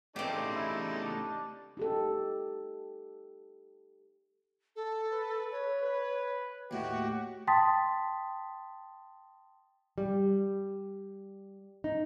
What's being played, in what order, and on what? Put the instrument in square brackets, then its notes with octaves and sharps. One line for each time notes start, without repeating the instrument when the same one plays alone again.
[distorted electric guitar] A2 C#3 [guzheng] C4 G4 [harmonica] D#4 A4 D5
[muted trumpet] E4
D4
[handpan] D#4 G4 A4
[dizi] A4
[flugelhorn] B4
[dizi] C#5
[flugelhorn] B4
[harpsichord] D#2 A2 [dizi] F#4 [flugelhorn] G4
[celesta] G5 A5 C6 D#6 A6 B6
[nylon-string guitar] G3
D#4